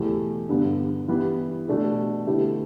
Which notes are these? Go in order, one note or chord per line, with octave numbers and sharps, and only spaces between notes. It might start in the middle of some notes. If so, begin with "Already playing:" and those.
Already playing: E2 B2 A3 G4
G2 D3 B3
E3 B3 G4 B4
B2 A3 D4 A4
D3 A3 E4 G4 B4